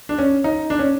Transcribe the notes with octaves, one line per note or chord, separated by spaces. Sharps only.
D4
C#4
D#4
D4
C#4